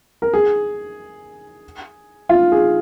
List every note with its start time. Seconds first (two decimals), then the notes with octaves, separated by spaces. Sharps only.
0.22 A#4
0.34 G#4
2.29 F4
2.52 G#4